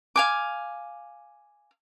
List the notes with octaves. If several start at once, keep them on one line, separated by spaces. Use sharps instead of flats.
F5 G#5 D6